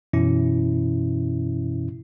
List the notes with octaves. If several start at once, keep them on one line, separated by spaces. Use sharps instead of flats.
F#2 B2 E3 C#4 E4